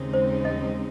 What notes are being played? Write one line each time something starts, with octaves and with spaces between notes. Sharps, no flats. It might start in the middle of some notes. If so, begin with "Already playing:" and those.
Already playing: D#2 C#3 G#3 C4 D#4
C5
D#5